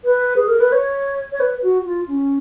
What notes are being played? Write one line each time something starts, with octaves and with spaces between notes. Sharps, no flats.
B4
G#4
A#4
B4
C#5
C#5
B4
F#4
F4
C#4